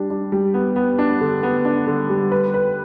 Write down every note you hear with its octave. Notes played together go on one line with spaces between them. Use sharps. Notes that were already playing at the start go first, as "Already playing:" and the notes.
Already playing: G3 D4
D4
G3
B3
B3
D4
D3
B3
D4
D3
G3
B4
B4